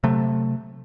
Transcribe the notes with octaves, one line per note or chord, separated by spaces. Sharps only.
C3 F#3 A3